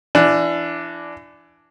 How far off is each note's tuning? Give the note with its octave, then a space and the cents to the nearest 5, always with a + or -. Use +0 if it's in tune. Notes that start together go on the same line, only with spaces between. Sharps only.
E3 +25 D4 +0